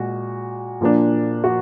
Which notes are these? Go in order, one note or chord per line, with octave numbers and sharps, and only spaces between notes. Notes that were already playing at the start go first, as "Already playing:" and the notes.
Already playing: A#2 G#3 F#4
A#2 F3 A#3 D4
F#4